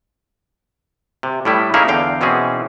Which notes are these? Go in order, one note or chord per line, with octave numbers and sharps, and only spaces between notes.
C3
A2 G3 E4
A#3 C#4 D#4 E4 G#4 A#4
E2 D3 F5 G5
B2 E3 C4 C#4 G#4